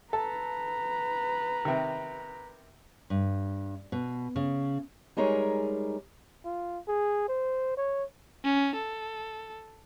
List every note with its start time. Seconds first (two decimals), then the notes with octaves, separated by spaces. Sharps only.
0.13 A4 B4 A#5
1.65 C3 D#3
3.10 G2
3.92 B2
4.36 C#3
5.17 G3 G#3 D#4 G#4 A#4 C#5
6.45 F4
6.88 G#4
7.29 C5
7.77 C#5
8.44 C#4
8.76 A4